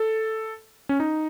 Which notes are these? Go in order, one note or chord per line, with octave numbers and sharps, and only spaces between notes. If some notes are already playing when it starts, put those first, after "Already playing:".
Already playing: A4
C#4
D#4